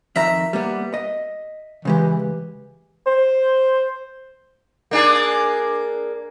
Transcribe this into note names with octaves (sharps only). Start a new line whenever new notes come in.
F2 D#3 E5 A#5
G3 A#3 B3
D#5
C#3 E3 G#3 G4
C5
A#3 D4 G#4